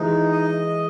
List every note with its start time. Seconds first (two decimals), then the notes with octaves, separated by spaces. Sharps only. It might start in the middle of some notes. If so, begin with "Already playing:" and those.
Already playing: E3 G#3 D#4
0.32 D#5